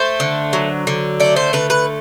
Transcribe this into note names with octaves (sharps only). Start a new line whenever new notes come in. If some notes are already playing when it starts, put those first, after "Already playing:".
Already playing: A3 C5
D3
F#3
D3
A3 D5
C5
D3 B4
B4